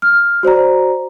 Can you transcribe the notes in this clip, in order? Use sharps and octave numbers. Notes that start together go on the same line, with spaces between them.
F6
F#4 C5 D5 A#5